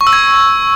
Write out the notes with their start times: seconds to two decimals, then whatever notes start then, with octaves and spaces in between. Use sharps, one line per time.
0.01 C#6
0.07 E6
0.13 G#6